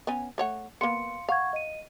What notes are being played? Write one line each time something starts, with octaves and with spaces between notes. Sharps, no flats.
B3 C#4 G#5
A3 C#5 F#5
A#3 B3 F5 C6 C#7
F5 F#5 C#6 G#6
D#5 D#7